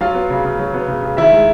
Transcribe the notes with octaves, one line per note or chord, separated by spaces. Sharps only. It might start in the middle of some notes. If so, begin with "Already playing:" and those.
F#3 F4 F5
B3
C#3
C#3
F#3
B3
C#3
C#3
D#3 E4 E5
G#3